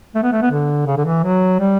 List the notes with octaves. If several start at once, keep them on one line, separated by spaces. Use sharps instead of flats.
A3
B3
A3
B3
D3
C#3
D3
E3
F#3
G3